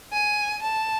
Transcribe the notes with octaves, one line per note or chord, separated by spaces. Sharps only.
G#5
A5